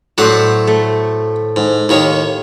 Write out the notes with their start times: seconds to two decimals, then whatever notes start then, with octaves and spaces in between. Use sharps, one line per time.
0.18 A2 F#3 C5 D5 F#5
0.67 A3
1.56 G#2
1.89 D#2 D#3 C#5